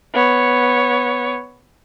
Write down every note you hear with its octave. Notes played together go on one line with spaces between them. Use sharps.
B3 C#5